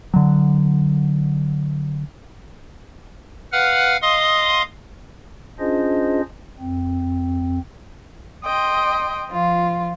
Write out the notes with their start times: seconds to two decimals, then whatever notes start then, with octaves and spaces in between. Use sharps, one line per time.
0.14 D3 F#3
3.52 B4 F5 F#5 F6
4.02 D#5 F5 C6 D#6
5.60 C#4 D4 F4 G#4 C5 D#5
6.59 F2 C4
8.44 D#5 G5 C6
9.30 F3 F4